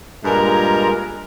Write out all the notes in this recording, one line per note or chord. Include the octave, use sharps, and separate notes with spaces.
G2 A#2 G#3 A#4 G#5 A#5